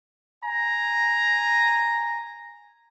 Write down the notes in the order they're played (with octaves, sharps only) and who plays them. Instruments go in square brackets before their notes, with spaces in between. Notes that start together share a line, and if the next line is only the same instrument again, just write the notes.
[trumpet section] G#5 A#5